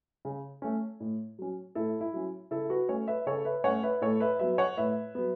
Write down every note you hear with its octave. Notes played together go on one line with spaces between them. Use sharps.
C#3
A3 C#4
A2
F#3 C#4
A2 E4 A4
E4
F#3 C#4
C#3 E4 A4
F#4 B4
A3 C#4 A4 C#5
B4 E5
C#3 A4 C#5
B4 E5
A3 C#4 C#5 F#5
B4 E5
A2 A4 C#5
B4 E5
F#3 B3 B4 E5
C#5 F#5
A2 B4 E5
F#3 B3